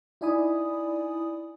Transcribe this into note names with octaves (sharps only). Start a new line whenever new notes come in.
D#4 E4 D5 G#5 B5 D#6